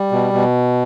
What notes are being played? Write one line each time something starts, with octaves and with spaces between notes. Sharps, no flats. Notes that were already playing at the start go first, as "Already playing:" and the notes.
Already playing: G3
B2
B2